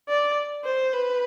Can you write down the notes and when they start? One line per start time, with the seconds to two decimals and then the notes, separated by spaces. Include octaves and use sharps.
0.08 D5
0.64 C5
0.93 B4